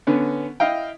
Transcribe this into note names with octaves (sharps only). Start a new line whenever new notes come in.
D3 B3 C#4
E4 D#5 F5 G5